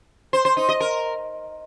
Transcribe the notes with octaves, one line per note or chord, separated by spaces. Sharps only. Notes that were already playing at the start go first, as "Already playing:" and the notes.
C5
C5
D#4
D#5
A#4